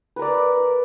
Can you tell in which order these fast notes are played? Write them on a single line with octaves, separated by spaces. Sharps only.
B4 A#4 D5 A#5